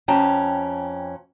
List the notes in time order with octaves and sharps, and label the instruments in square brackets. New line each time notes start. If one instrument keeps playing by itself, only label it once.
[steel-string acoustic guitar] F2 C#4 G5 A5 A#5